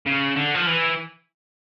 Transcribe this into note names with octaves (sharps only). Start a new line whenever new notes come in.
C#3
D3
F3
E3